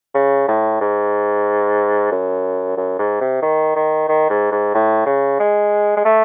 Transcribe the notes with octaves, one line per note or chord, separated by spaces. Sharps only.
C#3
A2
G#2
F#2
F#2
G#2
C3
D#3
D#3
D#3
G#2
G#2
A2
C#3
G#3
G#3
A3